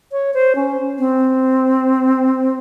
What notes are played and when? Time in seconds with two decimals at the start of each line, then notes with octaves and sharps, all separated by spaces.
0.12 C#5
0.34 C5
0.55 C#4
0.98 C4